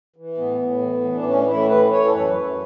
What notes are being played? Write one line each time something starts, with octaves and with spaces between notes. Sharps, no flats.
E3
A2 B3
A2
E3
E3
D4
A2 C#4
A2 E4
E3 B4
E3 C#5
A4
F#2 B4
F#2